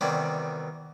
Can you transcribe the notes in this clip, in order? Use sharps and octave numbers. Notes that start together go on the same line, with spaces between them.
E2 C3 D#3 G3 D5